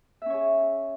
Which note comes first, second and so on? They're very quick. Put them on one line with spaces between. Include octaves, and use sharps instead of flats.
E5 C#4 C#5 G#4